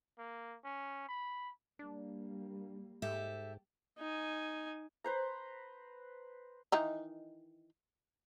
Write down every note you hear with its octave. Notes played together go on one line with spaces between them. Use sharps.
A#3
C#4
B5
G3 A#3 D4
G#2 G4 A4 E5
D#4 G#5
B4 C5 A#5
D#3 E3 D#4